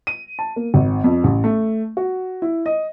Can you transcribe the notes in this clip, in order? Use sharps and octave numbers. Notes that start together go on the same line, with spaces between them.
D#7
A5
A#3
G#1
F2
A1
A3
F#4
E4
D#5